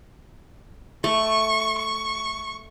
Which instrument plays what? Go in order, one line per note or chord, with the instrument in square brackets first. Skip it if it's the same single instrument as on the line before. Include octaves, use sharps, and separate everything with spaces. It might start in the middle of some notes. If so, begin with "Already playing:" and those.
[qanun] A3 [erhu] C#6
[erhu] C#6